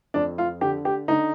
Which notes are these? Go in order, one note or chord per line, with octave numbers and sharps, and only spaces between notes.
F2 D4
F4
D3 G4
G4
D3 D#4